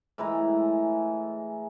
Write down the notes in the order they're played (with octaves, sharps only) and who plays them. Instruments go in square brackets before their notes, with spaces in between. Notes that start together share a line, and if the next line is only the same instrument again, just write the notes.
[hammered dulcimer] A2 E3 G#3 A#5